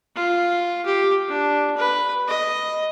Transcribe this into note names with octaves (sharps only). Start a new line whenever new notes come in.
F4
G4
D4
B4
D#5